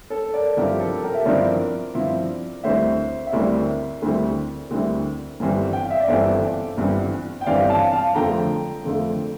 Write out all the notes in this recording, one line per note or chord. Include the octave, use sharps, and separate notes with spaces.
A4
A#4 D5
G2 F3 C4 E4 G4 A#4
A4
G4 A#4
E5
G2 F3 C4 E4 A#4 D5
G2 F3 C4 E4
D2 D3 G3 C4 E4 C5 E5
E5
D2 D3 G3 C4 E4 A#4 D5
D2 D3 G3 C4 E4
D2 D3 G3 C4 E4
G1 G2 E3 G3 C4
G5
F5
E5
D5
G1 G2 E3 G3 C4 A4 C5
G1 G2 E3 G3 C4
G5
G1 G2 E3 G3 C4 D5 F5
F5 A5
F5 A5
F2 D3 F3 A3 G5 A#5
F2 D3 F3 A3